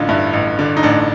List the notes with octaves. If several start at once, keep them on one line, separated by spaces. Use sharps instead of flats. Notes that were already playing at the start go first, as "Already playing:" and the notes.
Already playing: A1 D3 D#4 F4
G2 E4
A1
D3
D#4
A1 D4